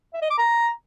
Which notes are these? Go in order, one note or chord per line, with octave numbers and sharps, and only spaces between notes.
E5
D#5
D6
A#5